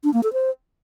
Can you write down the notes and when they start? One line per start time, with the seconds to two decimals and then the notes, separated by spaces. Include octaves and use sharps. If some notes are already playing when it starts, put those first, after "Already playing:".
0.04 D4
0.14 A#3
0.23 A4
0.33 C5